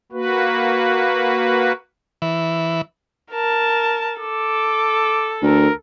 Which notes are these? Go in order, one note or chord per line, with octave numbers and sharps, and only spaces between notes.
A#3 F#4 B4
E3
A#4 A5
A4 D6
D2 A#4